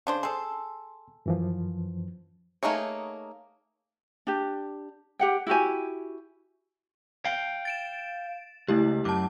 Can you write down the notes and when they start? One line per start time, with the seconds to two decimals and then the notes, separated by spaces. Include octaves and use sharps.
0.07 C#3 D4 C5
0.23 G#4 A4 C6
1.26 F#2 E3 F3
2.63 A3 A#3 D#4 G#4 C#5
4.27 D4 G4
5.19 G4 F#5 G5
5.47 E4 F#4 G4 G#5
7.25 F5 G5
7.65 A6 D7 E7
8.68 C#2 A3 E4 G4
9.05 F#2 A5 D6